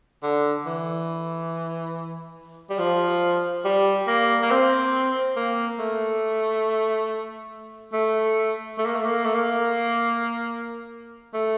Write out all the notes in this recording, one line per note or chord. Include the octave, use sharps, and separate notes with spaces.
D3
E3
G3
F3
G3
A#3
A#3
C4
A#3
A3
A3
A3
A#3
A3
A#3
A3
A#3
A3